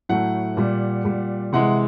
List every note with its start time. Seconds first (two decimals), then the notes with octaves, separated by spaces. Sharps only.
0.09 A2 F#3 A3 F#5
0.57 A#2 G3
1.04 A#2 G3
1.53 C3 E3 G#3 F#5